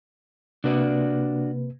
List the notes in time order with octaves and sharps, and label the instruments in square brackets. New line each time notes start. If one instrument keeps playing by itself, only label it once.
[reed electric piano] C3 A#3 B4 [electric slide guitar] D4 F#4 D5